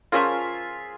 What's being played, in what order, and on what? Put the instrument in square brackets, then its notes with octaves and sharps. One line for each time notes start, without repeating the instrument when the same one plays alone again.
[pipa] F3 C#4 A#4 [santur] F4 G#4 E5